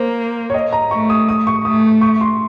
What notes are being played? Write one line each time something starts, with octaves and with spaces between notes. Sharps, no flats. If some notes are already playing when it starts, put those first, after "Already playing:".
Already playing: A#3 C5
C#5
D#5
A#5
A3 C#6
D#6
D#6
C#6
A3 D#6
C#6
C6